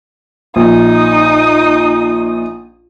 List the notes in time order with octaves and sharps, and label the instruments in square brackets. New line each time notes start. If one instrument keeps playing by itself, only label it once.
[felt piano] A#1 [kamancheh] D#4 D#6